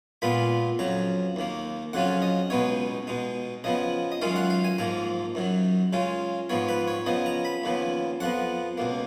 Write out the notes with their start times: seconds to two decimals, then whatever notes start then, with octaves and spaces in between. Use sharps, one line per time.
0.22 A#2 G#3 B3 F4 B5
0.79 F2 C#3 F#3 A#5
1.36 D#2 D#3 A#3
1.93 F2 C#3 F#3 C#4 F4 F#5
2.22 D#5
2.50 C#2 B2 G#3 B3 D#4 C#5
3.07 B2 G#3 D#4
3.64 C#3 F3 B3 D#5
4.12 D#5
4.21 F#2 D#3 G#3 C#4 F4 F5
4.36 F#5
4.50 F5
4.64 G#5
4.78 G#2 F3 A#3 A#5
5.35 F#2 D#3 F#3
5.93 C#3 G#3 C#4 F4
6.50 G#2 F3 B3 C#5
6.68 B4
6.88 C#5
7.06 C#3 F3 B3 D#5
7.26 A#5
7.45 B5
7.64 D#2 C#3 F3 B3
8.20 F2 F3 B3 F#5
8.78 C#2 B2 A#3